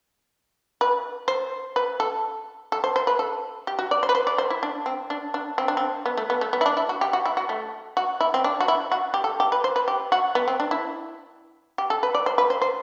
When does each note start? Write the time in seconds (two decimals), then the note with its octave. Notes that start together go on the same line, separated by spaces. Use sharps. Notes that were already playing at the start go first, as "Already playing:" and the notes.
0.81 B4
1.28 C5
1.76 B4
2.00 A4
2.72 A4
2.84 C5
2.96 C5
3.07 B4
3.19 A4
3.67 G4
3.79 F#4
3.91 D5
4.03 C5
4.09 B4
4.15 C5
4.27 D5
4.38 C5
4.50 E4
4.63 D4
4.86 C4
5.10 D4
5.34 D4
5.58 C4
5.68 D4
5.77 C4
6.06 B3
6.17 A3
6.30 B3
6.41 A3
6.53 B3
6.61 E4
6.66 D4
6.77 E4
6.89 F#4
7.01 G4
7.13 F#4
7.25 E4
7.37 F#4
7.49 A3
7.97 F#4
8.21 E4
8.34 C4
8.44 D4
8.60 F#4
8.68 E4
8.92 F#4
9.14 G4
9.24 A4
9.40 G4
9.52 B4
9.64 C5
9.76 B4
9.88 G4
10.12 F#4
10.35 B3
10.48 C4
10.60 D4
10.71 E4
11.78 G4
11.90 A4
12.03 B4
12.15 D5
12.26 C5
12.38 B4
12.50 C5
12.62 C5